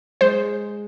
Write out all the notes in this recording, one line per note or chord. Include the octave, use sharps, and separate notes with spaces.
G#3 C5